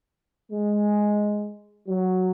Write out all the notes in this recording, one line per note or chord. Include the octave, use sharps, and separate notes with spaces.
G#3
F#3